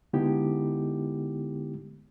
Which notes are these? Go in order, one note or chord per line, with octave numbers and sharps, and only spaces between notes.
D3 G#3 B3 D#4 E4 G4